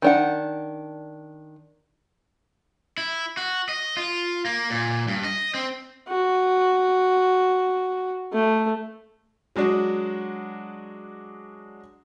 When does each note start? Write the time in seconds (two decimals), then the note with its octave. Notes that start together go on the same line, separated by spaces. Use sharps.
0.02 D#3 D4 F#5
2.98 E4
3.37 F#4
3.69 D#5
3.97 F4
4.45 A#3
4.70 A#2
5.08 G2
5.24 D#5
5.55 C4
6.09 F#4
8.33 A3
9.56 F#3 G#3 D4 F#4